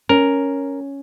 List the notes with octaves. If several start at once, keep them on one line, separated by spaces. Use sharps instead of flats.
C#4 A#4